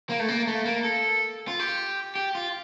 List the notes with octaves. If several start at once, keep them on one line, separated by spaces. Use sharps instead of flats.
A#3
A3
A#3
A3
A#3
A4
F4
G4
G4
F4